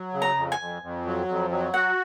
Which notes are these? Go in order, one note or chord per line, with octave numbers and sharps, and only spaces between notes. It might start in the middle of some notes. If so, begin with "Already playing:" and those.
Already playing: F#3
C#3
A#5
F2
G#5
F2
F2
F#3
F2
F#3
F#4 F#5